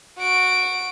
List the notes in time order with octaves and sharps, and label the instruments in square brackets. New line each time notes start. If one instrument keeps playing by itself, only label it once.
[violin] F#4 D7